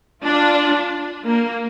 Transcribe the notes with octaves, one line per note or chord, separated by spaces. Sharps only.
D4 F4
A#3